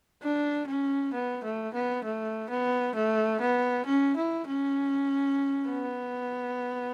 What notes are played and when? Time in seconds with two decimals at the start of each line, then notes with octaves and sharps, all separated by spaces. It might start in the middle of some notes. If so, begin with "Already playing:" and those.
0.23 D4
0.68 C#4
1.13 B3
1.44 A3
1.74 B3
2.04 A3
2.50 B3
2.95 A3
3.41 B3
3.86 C#4
4.17 E4
4.47 C#4
5.69 B3